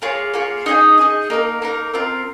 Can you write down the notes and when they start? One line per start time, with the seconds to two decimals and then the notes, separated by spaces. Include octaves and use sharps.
0.02 A#3 F4 G#4 C#5
0.34 A#3 F4 G#4 C#5
0.66 D#4 G#4 D#5 G#5
0.98 D#4 G#4 D#5 G#5
1.30 A#3 D#4 A#4
1.62 A#3 D#4 A#4
1.94 C4 F4 A#4